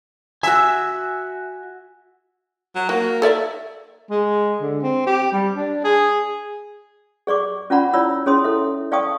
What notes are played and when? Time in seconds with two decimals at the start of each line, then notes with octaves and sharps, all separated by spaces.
0.43 F#4 E5 G#5
2.75 F#3
2.89 A#3 F#4
3.22 A4 D5 E5
4.10 G#3
4.61 D3
4.82 C4
5.06 G4
5.32 G3
5.55 D4
5.84 G#4
7.27 G#4 D5 C#6 D6
7.70 C#4 F4 D5 F#5 A#5 B5
7.93 E4 F4 C#5 D5 B5 E6
8.26 C#4 G#4 C#5 C6 D#6
8.44 E4 A4 E5
8.92 D5 F5 G5 A5 C#6 D#6